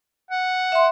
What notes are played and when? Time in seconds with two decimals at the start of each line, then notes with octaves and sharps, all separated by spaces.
0.31 F#5
0.72 E5 C6